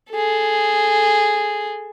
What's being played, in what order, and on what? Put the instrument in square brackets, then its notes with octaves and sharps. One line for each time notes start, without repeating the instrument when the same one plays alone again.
[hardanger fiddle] G#4 A4